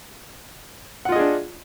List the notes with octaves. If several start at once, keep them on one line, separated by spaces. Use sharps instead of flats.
D4 F4 G#4 D#5 F#5